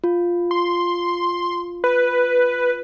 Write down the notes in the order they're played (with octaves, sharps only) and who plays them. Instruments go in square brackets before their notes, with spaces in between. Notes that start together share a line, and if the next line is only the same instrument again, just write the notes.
[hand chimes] F4
[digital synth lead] C6
B4